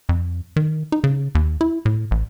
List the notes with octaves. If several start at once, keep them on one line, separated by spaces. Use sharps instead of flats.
F2
D#3
D#4
C#3
D#2
E4
A2
A1